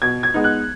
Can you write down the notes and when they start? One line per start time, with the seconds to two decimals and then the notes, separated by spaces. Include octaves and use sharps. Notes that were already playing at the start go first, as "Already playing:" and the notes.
0.02 B2 G#6
0.23 G#6
0.34 G#3 B3 D#4
0.44 F#6